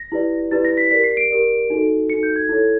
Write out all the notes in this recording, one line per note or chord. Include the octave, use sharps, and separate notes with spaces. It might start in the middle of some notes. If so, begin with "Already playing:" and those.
Already playing: A#6
E4 G4 B4 D5
E4 G4 B4 D5 A6
A#6
B6
G4 A#4 D5 B6
C7
D7
G4 A#4 D5
D#4 F#4 A4
D#4 F#4 A4 C#7
G6
G#6
E4 A4 C#5